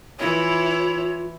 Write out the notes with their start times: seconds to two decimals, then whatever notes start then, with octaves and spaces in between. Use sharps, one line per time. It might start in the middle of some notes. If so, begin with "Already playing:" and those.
0.19 E3 E4 F4 C#5